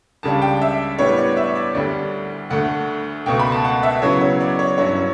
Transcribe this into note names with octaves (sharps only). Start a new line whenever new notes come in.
C#2 C#3 G3 D4 A5
G5
E5
A2 G3 B3 D4 C#5
D5
E5
D5
D2 D3 G3 D5
D2 D3 A3 F#5
C#2 B2 A3 G5
B5
A5
F#5
E5
C#3 F#3 B3 E4 C#5
C#5
D5
C#5
G2 F#3 C#4 E4 C#5